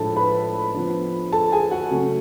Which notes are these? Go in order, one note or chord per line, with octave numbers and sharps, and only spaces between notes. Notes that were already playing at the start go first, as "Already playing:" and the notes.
Already playing: A2 F3 G#3 D4 A4 A5
B4 B5
F3 B3 D4
A4 A5
G#4 G#5
F#4 F#5
C#3 F#3 A3 C#4